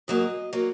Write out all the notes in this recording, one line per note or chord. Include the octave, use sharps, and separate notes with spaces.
G#2 F#3 A#3 D#5
F#3 A#3